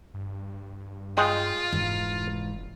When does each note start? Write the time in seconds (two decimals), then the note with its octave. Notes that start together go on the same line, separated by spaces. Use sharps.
0.14 G2
1.17 G#3 F4 D#5 G5
1.72 F1 G#2 E3